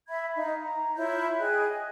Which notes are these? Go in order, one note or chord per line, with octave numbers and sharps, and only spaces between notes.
E5 B5 G#6
D#4 F5
A#5
E4 F4 C#5 G6
G#4 D#5 G5 F#6
D#5